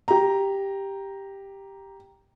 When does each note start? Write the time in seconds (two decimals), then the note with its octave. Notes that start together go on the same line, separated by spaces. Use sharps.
0.08 G4 A#5